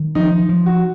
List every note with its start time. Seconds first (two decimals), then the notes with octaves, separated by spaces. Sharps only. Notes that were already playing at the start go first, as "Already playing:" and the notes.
Already playing: D#3
0.15 F3 D#4
0.49 F3
0.66 F#4